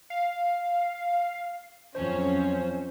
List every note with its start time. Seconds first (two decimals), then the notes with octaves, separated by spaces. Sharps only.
0.10 F5
1.95 F2 F#3 C#4 C5